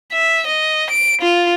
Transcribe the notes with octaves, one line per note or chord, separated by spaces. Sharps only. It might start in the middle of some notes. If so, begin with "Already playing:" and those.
E5
D#5
D7
F4